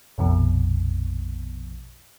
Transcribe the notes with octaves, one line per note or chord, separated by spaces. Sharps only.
A#1 F2 B2